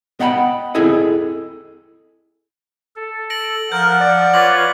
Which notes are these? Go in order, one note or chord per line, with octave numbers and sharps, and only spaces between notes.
B3 D#5 F#5 G5 A5 B5
C4 E4 G#4 A4 D#5
A4
A#6 D7 F#7
F3 A#4 F#5 F6 G6
D5
F4 B4 C#5 D6 A#6 F#7